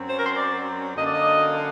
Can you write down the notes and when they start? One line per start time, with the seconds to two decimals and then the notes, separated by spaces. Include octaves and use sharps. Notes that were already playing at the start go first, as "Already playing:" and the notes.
Already playing: F#2 F#3 C4
0.09 C5
0.16 A#4
0.23 C5
0.37 D5
0.95 F#2 D3 F#3 A#3 D4 D#5
1.04 D5
1.12 D#5